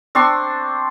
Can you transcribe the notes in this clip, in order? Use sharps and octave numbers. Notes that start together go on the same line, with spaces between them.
C4 D4 C6 C#6